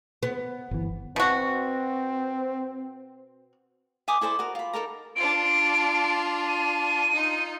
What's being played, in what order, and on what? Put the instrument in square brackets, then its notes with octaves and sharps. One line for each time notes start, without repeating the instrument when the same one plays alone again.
[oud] B3
[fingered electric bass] G1 E3
[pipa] B2 F#4 [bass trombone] C4
[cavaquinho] E5 G#5 D6 D#6
E4 A4 C5 D5
F#4 A#4
F4 B5
D#4 A4 A#4 A#5
[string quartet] D4 F4 [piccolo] D7
[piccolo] D#7
[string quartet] D#4 F4